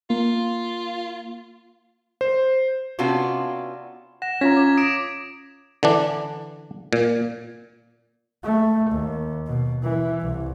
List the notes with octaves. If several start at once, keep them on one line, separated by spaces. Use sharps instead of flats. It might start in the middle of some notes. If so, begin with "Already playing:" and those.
A#3 F4
C5
C3 B3 C#4 D4 F4 F#4
F#5 A#6 E7
C#4 F4 A#5 G#6 A#6 B6
D6 G#6
D#6 D7 E7
D3 E3 D4
A#2
A3
D#2
B2
E3
C2